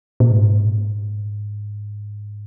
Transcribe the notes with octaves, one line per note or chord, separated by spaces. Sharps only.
A#2
G#2